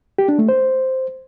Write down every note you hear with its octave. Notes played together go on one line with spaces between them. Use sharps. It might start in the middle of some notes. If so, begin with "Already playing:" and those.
G4
D4
A3
C5